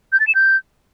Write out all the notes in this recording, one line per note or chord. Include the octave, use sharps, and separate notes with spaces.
G6
A6
E7
G6